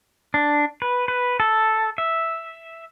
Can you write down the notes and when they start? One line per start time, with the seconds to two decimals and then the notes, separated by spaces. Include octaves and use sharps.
0.34 D4
0.82 B4
1.08 B4
1.40 A4
1.98 E5